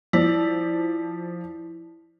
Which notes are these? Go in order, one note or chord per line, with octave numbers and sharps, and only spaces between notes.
F3 E4 D5